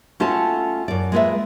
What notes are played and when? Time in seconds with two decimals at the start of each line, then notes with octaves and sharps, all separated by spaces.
0.20 A3 C#4 F4 F#4 A4 A5
0.88 F#2 D5
1.12 G#3 A#3 F4 G#4 B4 E5